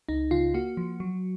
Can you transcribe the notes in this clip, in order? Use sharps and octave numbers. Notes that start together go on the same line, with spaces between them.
C#2 D#4
C#3 F4
A#3 F#4
F3
F#3